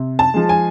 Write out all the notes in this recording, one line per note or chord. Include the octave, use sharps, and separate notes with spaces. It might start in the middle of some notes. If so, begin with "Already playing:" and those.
Already playing: C3
A5
F3 G#3
G#5